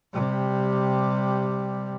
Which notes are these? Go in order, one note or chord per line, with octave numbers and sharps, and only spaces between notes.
C3 G3